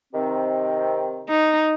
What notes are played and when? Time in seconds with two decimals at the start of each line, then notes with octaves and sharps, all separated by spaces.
0.13 C3 D#3 C4
1.29 D#4